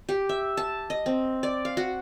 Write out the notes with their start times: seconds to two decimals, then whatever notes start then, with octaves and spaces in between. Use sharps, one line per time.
0.09 G4
0.29 E5
0.57 A5
0.90 D#5
1.06 C4
1.43 D5
1.65 F5
1.77 F#4